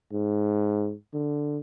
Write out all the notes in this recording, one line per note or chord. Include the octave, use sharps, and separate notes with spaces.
G#2
D3